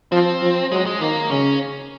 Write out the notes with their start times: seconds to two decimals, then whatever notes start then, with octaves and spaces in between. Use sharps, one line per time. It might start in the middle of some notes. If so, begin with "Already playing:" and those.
0.12 F3 C4
0.42 F3
0.72 F#3 G#3
0.86 G#3
1.01 D#3 A#3
1.30 C#3 C#4